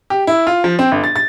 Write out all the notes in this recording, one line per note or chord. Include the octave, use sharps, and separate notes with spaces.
G4
E4
F4
F3
C4
G1
A6
A6